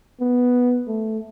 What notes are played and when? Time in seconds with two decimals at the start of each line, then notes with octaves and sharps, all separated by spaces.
0.21 B3
0.88 A3